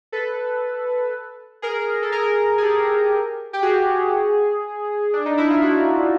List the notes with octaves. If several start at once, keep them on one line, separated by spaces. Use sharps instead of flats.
A4 B4
G#4 A#4
A4
G#4 A#4
G#4
G4 A4
G4
F#4 G#4
D4
D#4
E4
F4
E4 F#4